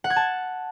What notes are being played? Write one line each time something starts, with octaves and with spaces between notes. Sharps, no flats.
F#5
G#6
A5